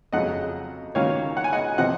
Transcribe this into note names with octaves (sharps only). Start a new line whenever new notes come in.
F2 C#3 F#3 D#5 F#5
D#3 F#3 A#3 C#4 C#5 F5
F#5
G#5
D#5 F#5
C3 F3 C4 D#5 F#5